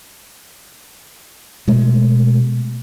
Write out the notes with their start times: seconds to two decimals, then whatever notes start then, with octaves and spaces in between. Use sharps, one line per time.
1.68 B2 G#3 A3